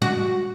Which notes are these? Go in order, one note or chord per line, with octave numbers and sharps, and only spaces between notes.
F#4